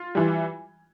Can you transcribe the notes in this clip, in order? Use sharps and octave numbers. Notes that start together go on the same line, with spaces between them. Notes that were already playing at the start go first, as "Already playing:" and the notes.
Already playing: F4
E3 G3